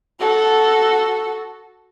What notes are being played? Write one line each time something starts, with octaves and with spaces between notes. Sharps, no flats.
F#4 A4